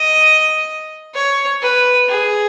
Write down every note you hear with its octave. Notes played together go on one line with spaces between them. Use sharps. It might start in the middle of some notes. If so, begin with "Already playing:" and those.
Already playing: D#5
C#5
B4
G#4